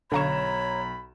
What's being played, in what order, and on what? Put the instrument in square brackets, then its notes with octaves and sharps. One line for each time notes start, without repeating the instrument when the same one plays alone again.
[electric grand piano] B1 A#5 E7 [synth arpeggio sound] D3 F5 C#6 [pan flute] C#5 [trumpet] B5